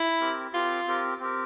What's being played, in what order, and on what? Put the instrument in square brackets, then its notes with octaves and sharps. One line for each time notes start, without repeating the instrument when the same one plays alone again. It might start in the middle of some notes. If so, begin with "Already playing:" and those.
Already playing: [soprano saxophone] E4
[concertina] C4 G4 A#4
[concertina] C4 G4 A#4 [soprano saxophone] F4
[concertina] C4 G4 A#4
C4 G4 A#4